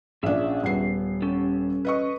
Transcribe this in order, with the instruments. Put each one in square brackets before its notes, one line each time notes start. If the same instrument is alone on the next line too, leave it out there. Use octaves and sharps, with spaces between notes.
[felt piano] A#1 D4 [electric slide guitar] C#4 G#4 E5
[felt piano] D#1 B3 C7
[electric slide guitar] C#4 G4 A4
[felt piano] B4 D#5 C#6